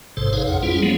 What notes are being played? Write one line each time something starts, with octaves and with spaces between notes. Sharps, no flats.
A1 G#2 C3 A4 C5
D#4 G#4 B4 C#5 F5
F2 F#5
G3 C#4 E4 F4 G#4
F3 F#3 G#3 A#3 B3